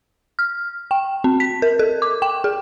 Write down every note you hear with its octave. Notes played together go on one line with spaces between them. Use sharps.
F6
G5
C4
B6
A#4
A4
D6
G5
G#4